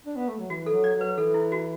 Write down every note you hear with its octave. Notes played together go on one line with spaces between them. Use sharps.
D4
B3
A3
F#3
E3 F#4
A4
F#3
D5
F#3
B4
E3 A4
E4
F#4